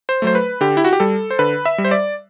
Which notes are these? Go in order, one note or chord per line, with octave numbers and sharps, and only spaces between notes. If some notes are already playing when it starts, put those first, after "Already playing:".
C5
F#3 A3 C5
B4
D3 G4
E4
F#4
G4
G3 A4
C5
D3 B4
E5
G3
C5
D5